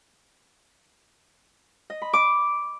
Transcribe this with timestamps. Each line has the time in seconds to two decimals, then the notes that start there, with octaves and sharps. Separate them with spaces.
1.90 D#5
2.02 B5
2.13 D6